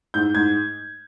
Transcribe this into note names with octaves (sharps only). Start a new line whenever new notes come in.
G#2 G6
G#2 G#6